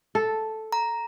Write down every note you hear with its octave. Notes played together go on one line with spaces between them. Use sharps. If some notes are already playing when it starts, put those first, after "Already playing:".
A4
A#5